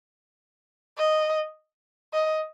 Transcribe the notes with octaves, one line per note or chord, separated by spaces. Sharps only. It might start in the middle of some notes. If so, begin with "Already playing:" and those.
D#5
D#5